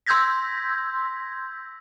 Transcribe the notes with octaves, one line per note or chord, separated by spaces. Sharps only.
C6 E6 G6 G#6 A#6 B6